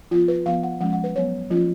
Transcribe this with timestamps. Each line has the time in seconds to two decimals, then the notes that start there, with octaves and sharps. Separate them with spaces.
0.11 F3 B3 F4
0.28 B4
0.46 F3 B3 F5
0.63 F#5
0.80 F3 G#3 C#4 F#5
0.93 F#5
1.04 B4
1.15 F#3 B3 C#5
1.51 F3 A#3 C#4 F4